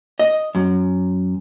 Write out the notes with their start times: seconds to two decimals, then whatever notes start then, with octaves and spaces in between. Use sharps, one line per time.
0.19 D#5
0.55 F#2